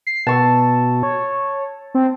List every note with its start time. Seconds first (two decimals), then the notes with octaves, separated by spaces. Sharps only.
0.07 C7
0.27 B2 A5 C#6 E6
1.03 C#5
1.95 C4